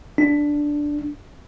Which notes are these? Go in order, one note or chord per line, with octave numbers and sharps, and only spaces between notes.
D4